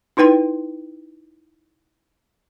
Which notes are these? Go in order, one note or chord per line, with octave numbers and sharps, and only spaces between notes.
D#4 E4 B4 G5 C6